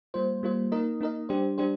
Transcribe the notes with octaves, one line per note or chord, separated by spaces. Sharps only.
G3 A#3 F4 C5
G3 A#3 F4 C5
A#3 D#4 A#4 D#5
A#3 D#4 A#4 D#5
G3 D4 G4 C5
G3 D4 G4 C5